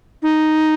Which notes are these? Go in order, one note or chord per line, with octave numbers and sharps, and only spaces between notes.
D#4